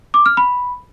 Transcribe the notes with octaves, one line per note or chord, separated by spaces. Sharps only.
D6
F6
B5